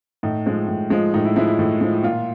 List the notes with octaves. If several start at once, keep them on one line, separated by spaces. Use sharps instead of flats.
A2 D#4
F3 G#3
A2
F3 G#3
A2 D#4
E4
F3 G#3 E4
E4
A2
F3 G#3
A#2 F4